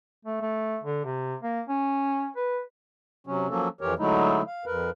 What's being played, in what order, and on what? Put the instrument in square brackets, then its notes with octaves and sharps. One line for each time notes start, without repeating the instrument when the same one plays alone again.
[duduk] A3
A3
D3
C3
A#3
C#4
B4
[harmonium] C3 F#3 C#4
F3 F#3 A#3 C#4 A4
F2 E3 G4 A#4 C#5
D3 F#3 G#3 A3 D#4 E4
F5
F2 A#4 B4